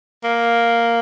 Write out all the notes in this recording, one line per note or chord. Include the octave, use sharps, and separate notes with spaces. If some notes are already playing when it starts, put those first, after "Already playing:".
A#3